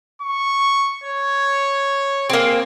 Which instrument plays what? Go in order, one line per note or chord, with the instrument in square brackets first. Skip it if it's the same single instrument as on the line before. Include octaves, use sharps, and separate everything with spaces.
[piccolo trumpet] C#6
C#5
[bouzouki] A#3 C4 [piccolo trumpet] G#4